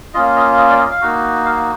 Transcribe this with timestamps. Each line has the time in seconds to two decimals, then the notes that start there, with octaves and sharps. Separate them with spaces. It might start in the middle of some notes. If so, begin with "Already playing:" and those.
0.14 A#3 C#4 F4 D#5
0.36 D#5
0.57 D#5
0.70 D5
0.79 D#5
0.91 F5
1.01 A#3 D#4 F#4
1.45 F5